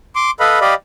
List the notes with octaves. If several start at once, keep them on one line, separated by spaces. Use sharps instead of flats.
C6 D6
A4 B4 D#5 F5 B5
G4 D5 D#5 F5 B5